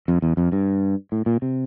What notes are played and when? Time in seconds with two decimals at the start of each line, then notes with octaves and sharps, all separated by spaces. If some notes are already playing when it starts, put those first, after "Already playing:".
0.08 F2
0.22 E2
0.37 F2
0.52 G2
1.12 A2
1.26 A#2
1.42 C3